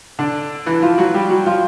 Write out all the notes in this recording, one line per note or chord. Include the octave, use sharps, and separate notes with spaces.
D3 D4
E3 E4
F3 F4
F#3 F#4
G3 G4
F#3 F#4
F3 F4